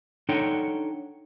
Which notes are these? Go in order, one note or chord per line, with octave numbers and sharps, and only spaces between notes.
D4 D#4 A4 C#5 F#5 G5